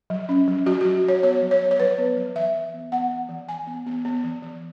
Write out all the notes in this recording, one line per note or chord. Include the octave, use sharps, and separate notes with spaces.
F#3
C#4
F#3
F#3 F#4
F#3 F#4
F#3 C#5
B3 C#5
F#3
C#5
B3
C#5
F#3 B4
B3
F#3
E3 E5
E3
B3
B3 F#5
B3
E3
E3 G#5
B3
B3
B3
E3
E3